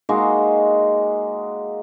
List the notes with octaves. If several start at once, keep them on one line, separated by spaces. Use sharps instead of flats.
G#3 A#3 D#4 F#4